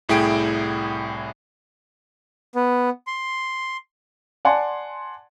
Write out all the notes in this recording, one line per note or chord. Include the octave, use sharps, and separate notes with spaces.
C2 A2 E4 G#4 G5 D7
B3
C6
D5 F#5 G#5 A5 C6